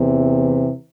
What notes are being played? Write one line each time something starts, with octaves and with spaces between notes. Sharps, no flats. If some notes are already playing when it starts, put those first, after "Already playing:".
Already playing: E2 C3 E3